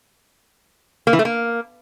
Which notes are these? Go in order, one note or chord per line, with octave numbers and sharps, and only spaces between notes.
A#3
E3
A3
A#3